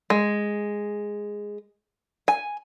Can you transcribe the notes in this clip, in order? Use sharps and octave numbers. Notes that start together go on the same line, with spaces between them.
G#3
G#5